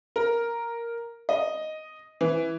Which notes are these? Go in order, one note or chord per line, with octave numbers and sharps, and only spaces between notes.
A#4
D#5
E3